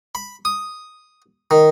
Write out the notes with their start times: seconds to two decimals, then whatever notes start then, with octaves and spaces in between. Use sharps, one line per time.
0.15 B5
0.45 D#6
1.51 D#3